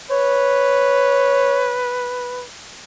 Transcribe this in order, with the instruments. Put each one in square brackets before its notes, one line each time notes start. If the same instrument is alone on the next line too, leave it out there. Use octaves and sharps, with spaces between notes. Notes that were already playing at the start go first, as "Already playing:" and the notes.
[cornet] B4 [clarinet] C#5